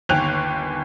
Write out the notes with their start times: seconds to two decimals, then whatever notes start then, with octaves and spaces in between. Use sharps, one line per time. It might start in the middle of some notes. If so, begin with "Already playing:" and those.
0.09 G1 D#2 G5 G#5 F#6 F7